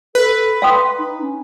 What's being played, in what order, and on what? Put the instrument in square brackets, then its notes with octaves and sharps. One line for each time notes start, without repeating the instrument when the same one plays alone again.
[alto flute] A4 [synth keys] B4
[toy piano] F5 G5 D#6 [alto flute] C6
[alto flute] D#4
C#4